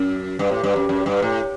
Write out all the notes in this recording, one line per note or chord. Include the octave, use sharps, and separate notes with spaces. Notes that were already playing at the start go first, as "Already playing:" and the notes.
Already playing: F#2
G2
A2
G2
F#2
F#2
G2
A2